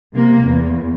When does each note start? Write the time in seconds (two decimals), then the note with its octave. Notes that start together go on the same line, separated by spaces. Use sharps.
0.15 C3 A#3
0.45 E2